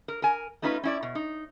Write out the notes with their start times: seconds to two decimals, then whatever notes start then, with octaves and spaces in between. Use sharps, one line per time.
0.08 A#4
0.22 A#4 G#5
0.62 A3 C#4 D#4 F4 B4
0.83 C#4 E4 D5
1.02 B2
1.15 D#4